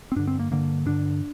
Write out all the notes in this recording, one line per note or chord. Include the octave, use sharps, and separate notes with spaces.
C4
G2 D3 D4
C4
A#3
G2 D3 A#3
G2 D3 D4